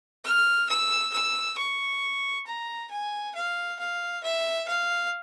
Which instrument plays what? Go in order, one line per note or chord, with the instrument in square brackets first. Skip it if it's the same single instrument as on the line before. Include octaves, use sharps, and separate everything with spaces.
[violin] F6
E6
E6
C#6
A#5
G#5
F5
F5
E5
F5